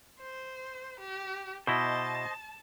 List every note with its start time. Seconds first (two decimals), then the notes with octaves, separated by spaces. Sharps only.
0.20 C5
1.00 G4
1.67 B2 E4 C5 D#5 A5